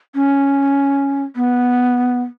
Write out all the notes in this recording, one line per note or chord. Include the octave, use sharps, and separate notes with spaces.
C#4
B3